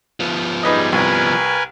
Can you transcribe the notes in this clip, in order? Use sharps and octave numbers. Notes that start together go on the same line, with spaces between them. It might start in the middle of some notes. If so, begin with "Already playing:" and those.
F3 B3
G3 D#4 G#4 B4 D#5
C2 A#4 B4 G#5